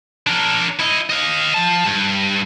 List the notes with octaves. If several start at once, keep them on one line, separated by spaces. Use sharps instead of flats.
D4 A#4
E4 D#5
D#5 F5
F3 A5
G2